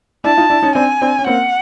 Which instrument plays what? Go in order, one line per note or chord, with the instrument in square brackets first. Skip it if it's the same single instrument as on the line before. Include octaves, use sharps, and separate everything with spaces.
[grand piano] D4 E4 [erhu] A5
[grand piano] D#4 F4
D4 E4
C#4 D#4
[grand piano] C4 D4 [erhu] G#5
[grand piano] C4 D4
C#4
[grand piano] A#3 C4 [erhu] F#5